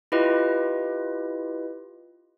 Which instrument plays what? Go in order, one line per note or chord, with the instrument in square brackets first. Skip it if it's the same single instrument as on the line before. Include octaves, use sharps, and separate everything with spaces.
[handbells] E4 F4 G4 B4 D#5